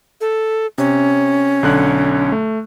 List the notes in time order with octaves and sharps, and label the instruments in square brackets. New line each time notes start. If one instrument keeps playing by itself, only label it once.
[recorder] A4
[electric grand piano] C3 [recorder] C#4
[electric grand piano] B1 D3 F#6
A3